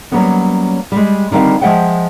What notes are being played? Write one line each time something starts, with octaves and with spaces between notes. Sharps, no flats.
F#3 G3 A#3 B3 C#4
G3 G#3
D3 D#3 G3 C4 F5
F3 G#3 D#5 E5 F#5 G5